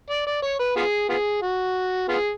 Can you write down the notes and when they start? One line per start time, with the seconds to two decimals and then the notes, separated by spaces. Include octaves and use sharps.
0.10 D5
0.27 D5
0.42 C#5
0.59 B4
0.76 B3 F4 G#4
1.09 B3 F4 G#4
1.42 F#4
2.08 B3 F4 G#4